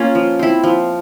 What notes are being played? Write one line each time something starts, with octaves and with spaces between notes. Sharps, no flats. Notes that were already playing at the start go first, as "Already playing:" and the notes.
Already playing: A#3 C#4 F4
F3
C4 E4
F3